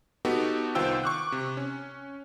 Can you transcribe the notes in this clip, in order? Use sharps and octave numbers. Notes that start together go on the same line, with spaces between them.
B3 D#4 F#4 G4 A4
C2 D#3 F4 C5 G5 E6
C#6 D6 F#6
C3
C#4